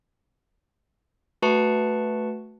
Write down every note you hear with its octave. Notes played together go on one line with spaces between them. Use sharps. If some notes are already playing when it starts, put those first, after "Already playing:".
A3 F#4 B4 A5 C#6 C#7